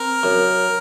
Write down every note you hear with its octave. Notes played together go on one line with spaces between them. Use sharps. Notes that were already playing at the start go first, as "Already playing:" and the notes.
Already playing: C4 A#4
F#2